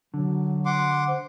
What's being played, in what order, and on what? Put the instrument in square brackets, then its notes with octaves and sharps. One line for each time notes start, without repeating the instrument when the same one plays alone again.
[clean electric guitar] D3 [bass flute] F#3
[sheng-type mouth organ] F#5 C6 D6
[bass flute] C5